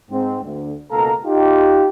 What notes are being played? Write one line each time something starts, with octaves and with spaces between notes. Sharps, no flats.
G#2 C4
D2
C#2 B2 A#3 A4 F5 A#5
D#4 F4 G4